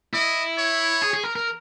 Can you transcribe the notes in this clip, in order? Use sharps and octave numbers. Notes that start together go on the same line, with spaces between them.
E4 D#5
C#5
G#4
G#4
A#4
A#4